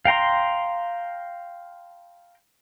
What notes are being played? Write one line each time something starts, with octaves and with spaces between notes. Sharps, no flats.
F5 G5 A#5 C6